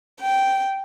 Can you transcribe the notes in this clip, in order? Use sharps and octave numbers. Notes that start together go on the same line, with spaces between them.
G5